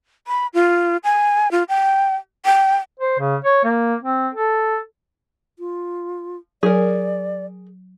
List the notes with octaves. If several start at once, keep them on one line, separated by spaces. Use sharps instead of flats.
B5
F4
G#5
F4
G5
G5
C5
C#3
C#5
A#3
C4
A4
F4
F#3 G#4 A#4 D5